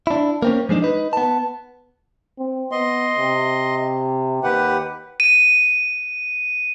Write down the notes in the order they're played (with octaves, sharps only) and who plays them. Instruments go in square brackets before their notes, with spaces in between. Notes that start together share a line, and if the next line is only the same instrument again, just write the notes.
[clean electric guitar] D4 E4
A#3 C4 C#4
F3 G#3 A#3 D4 D#4
D#4 B4
B3 A5
[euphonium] C4
[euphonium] B3 [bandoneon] D#5 C6
[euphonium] C3
[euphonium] D#2 [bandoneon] G4 B4 F#5
[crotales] D#7